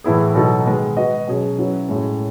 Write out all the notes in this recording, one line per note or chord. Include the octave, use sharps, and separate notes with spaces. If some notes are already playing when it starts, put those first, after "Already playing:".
A2 E3 B3 E4 G#4
B2 F#3 B3 D#4 A4
D#3 G#3 B3
B3 F#4 B4 D#5
B2 F#3 C#4 G#4
F#3 C#4 E4 B4
A2 G#3 C#4